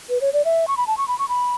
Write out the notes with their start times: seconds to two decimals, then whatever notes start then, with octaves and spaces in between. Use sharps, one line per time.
0.10 B4
0.21 C#5
0.33 D5
0.45 E5
0.68 C#6
0.77 B5
0.87 A5
0.98 C#6
1.08 B5
1.19 C#6
1.29 B5